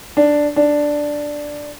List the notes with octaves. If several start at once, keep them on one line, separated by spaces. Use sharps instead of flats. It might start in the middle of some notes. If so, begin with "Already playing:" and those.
D4
D4